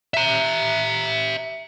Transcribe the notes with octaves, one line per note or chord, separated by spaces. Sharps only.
E5 A#5